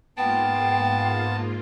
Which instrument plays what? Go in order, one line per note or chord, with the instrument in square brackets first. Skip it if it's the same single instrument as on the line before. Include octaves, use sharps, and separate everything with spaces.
[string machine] G#2 A#3 F4 [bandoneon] B3 A5 [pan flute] G5